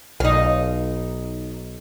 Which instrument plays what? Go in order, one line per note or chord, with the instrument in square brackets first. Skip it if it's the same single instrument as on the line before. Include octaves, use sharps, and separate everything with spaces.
[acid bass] B1 [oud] D#4 F5